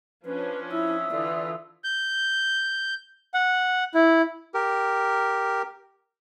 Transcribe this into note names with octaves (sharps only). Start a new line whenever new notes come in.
F3 C#4 D4 B4
E4 E5 D#6 E6
D3 E3 F4 D5
G6
F#5
E4
G4 A#4